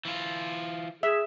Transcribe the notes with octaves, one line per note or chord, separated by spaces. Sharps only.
E3 F4
G#4 E5